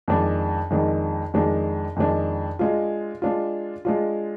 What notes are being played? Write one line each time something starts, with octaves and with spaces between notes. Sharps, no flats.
F2 D#3 G#3 D4
F2 D#3 G#3 D4
F2 D#3 G#3 D4
F2 D#3 G#3 D4
G#3 D4 F4
G#3 D4 F4
G#3 D4 F4